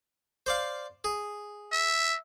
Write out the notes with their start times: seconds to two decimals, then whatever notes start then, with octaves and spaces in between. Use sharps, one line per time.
0.46 C5 D5 F5
1.04 G#4
1.72 E5